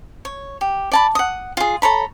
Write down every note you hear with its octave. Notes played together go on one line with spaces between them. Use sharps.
C#5
G4
D5 A5 B5
F#5 D#6
F4 G#4
A4 C#5 A#5 B5